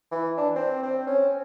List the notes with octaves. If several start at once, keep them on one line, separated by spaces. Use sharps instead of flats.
E3
D4
C4
C4
C#4